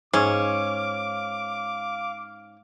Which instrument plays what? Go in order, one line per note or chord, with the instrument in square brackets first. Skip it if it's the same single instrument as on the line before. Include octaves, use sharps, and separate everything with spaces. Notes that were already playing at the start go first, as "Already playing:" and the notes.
[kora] G#2 G#4 [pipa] C#4 [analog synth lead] F5 [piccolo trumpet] D6